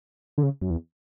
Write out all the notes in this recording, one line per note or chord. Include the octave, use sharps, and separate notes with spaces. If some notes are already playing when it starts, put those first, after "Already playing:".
D3
C#3
F#2
E2